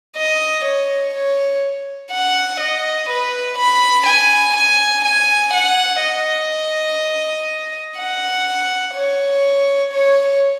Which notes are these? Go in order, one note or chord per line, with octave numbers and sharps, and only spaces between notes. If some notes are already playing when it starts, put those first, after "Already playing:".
D#5
C#5
C#5
F#5
D#5
B4
B5
G#5
G#5
G#5
F#5
D#5
F#5
C#5
C#5